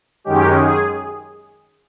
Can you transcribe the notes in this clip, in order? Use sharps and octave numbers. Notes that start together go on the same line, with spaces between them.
F#2 D#3 G#3 C#4 G4
G#4